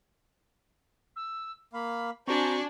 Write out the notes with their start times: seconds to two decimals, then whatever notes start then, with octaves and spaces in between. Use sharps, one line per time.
1.16 E6
1.73 A#3 F5 B5
2.27 C4 D4 F#4 C5 D5 G#5 A#5 C#6